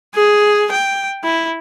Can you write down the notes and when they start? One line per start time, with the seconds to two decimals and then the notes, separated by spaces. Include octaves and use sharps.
0.15 G#4
0.71 G5
1.24 E4